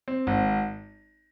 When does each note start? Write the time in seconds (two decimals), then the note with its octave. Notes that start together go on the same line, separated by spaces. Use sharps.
0.08 C4
0.27 G#1